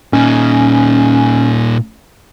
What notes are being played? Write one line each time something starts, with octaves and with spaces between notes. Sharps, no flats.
A#2 C#4 D#4